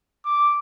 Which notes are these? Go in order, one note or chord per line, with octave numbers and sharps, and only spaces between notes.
D6